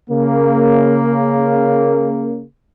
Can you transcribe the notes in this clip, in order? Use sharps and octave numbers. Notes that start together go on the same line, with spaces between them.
C#3 A#3